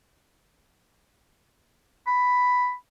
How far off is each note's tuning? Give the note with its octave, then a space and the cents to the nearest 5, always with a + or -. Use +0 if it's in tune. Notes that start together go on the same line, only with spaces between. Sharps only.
B5 +5